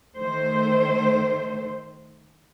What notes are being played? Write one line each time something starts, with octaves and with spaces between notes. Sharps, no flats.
D#3 A3 C5